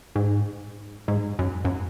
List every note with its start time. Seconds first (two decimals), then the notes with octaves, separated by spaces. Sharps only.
0.16 G#2
1.08 G#2
1.39 F#2
1.65 F#2